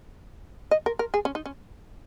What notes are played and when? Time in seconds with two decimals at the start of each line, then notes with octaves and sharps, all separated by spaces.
0.71 D#5
0.86 A#4
0.99 A#4
1.14 G#4
1.25 C#4
1.35 D#4
1.46 C#4